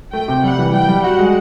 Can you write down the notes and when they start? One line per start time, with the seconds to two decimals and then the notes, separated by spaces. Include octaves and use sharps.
0.12 A3 G5
0.28 C3
0.44 G3 F#5
0.59 E3
0.73 G3 G5
0.88 G3
1.04 F#4 F#5
1.19 G#3